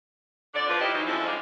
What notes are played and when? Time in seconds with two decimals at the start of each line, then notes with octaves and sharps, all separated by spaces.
0.54 F2 D3 D4 D5
0.68 F3 F4 B4
0.80 G3 E4 F4 G4 D#5
0.94 E3 F#3 D#4
1.06 D3 F3 G#3 C4 C#4 E4
1.26 G3 G#3 D4 D#4 F4 F5